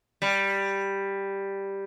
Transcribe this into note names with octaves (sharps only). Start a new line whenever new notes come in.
G3